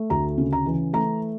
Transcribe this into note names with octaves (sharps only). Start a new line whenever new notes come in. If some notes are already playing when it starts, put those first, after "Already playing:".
Already playing: A3
D2 A#5
C#3
A#5
E3
A3 A#5